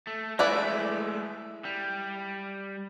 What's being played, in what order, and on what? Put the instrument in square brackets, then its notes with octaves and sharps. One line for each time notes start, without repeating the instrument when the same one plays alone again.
[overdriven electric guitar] A3
[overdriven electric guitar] G#3 A3 [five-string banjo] E4 B4 D5
[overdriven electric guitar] G3